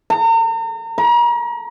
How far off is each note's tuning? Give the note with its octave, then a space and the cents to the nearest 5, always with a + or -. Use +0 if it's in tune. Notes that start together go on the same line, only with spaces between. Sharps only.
A#5 -40
A#5 +40